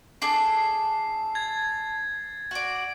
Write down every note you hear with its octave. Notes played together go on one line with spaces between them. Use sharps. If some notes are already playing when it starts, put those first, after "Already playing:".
D4 G#4 A4 C7
G#6 A6
F#4 D5